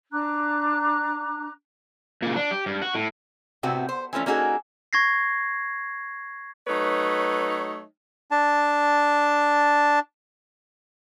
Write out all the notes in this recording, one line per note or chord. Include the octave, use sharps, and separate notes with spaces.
D4 A#5 D6 F#6
A#2 C#3
D4
G4
G2
F#4
A2
A2 C3 B3 C4 F#4
C5
E3 F3 A3 C#4
A#3 C#4 D#4 F#4 G#4 A4
C#6 G#6 A#6 C7
F#3 A3 D#4 B4 C#5
D4 A5